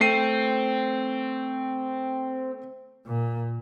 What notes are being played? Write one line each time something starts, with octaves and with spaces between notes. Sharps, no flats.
A3 C4 C7 D#7
A#2